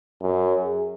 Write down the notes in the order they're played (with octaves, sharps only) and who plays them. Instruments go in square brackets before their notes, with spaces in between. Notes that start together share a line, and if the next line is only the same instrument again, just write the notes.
[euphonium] F#2
G#4